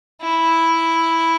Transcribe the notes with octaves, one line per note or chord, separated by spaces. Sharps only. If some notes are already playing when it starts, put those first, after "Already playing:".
E4